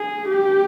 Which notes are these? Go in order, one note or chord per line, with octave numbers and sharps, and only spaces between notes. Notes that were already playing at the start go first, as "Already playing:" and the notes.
Already playing: G#4
G4